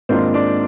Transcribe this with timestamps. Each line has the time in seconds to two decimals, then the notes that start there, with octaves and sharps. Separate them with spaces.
0.09 G#2 D#3 A#3 C4 D4 F4 C5
0.34 D4 D5